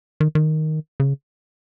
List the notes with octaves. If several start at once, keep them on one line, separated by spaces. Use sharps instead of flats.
D#3
D#3
C#3